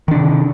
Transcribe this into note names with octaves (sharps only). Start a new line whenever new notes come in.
C3 D#3 D4